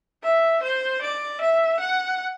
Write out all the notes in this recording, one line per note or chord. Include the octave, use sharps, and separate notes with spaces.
E5
C5
D5
E5
F#5